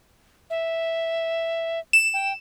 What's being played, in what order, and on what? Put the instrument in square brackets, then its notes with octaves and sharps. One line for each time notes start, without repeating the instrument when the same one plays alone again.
[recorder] E5
[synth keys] E7
[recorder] G5